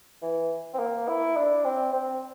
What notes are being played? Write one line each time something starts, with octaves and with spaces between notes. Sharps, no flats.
E3
C4
A#3
E4
D4
C4
C4